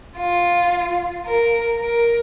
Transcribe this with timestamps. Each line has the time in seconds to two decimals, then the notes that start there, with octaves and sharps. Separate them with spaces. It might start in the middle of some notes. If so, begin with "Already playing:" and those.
0.18 F4
1.26 A#4
1.82 A#4